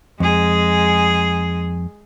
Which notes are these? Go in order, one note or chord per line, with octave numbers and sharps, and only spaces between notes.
F2 G#3 G#4